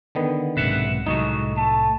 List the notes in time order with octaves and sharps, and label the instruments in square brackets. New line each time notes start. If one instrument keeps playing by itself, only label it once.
[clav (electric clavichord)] D3 D#3 B3
[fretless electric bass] B1 G#2 C3 [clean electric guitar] B4 E5 F#5
[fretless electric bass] C2 A2 F#3 [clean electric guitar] G#3 A3 F#4 [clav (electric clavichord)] D#4
[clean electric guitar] A3 [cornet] A5